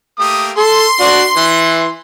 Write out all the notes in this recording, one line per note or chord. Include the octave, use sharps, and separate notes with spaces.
A3 A#3 G4 D#6
A4 C6
D4 F#4 D5
E3